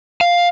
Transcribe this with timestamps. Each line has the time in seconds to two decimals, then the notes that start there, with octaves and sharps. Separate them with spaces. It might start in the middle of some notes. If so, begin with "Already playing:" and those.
0.21 F5